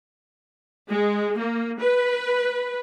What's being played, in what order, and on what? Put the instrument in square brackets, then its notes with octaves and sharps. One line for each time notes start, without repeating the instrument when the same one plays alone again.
[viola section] G#3
A#3
B4